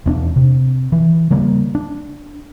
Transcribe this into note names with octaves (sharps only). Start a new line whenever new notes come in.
E1 C#4 D4
C3
E3
C#3 G3 A#3
D4